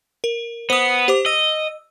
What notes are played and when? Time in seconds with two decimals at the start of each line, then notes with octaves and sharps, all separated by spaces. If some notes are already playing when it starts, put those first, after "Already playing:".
0.24 A#4
0.70 B3 C5 D#6
1.08 G4 C5 D6
1.26 D#5 E6